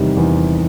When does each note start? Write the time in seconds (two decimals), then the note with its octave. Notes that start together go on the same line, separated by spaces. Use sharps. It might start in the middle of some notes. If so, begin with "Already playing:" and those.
Already playing: E2 C3 D#3 G3
0.17 E2